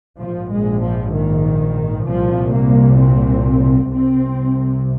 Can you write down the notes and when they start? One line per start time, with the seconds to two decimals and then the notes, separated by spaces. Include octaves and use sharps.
0.21 A#1 G#2 F3
0.52 G#3
0.83 F3
1.14 D#3
2.06 C2 A#2 F3
2.53 A#3
2.99 C4
3.91 C2 C3 C4